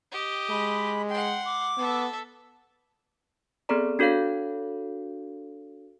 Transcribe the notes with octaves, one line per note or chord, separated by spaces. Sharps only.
G4 D#5
G#3 B5
F#5 G5 C6
D6
B3 A4 E5
B3 C4 G#4 A4 D5 A#5
D4 F#4 A4 C#5 F5 G6